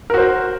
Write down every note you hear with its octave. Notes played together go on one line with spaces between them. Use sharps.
F#4 A#4 C5